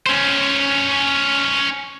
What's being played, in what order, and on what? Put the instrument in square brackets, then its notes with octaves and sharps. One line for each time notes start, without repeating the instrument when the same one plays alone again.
[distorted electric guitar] C#4 C5